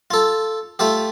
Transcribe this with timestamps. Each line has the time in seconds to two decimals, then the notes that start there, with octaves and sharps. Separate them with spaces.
0.11 F4 A4
0.79 A3 F4 G4